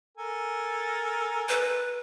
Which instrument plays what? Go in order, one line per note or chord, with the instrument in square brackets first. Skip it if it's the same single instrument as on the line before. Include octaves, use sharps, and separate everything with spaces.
[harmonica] A4 A#4 G#5
[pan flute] B4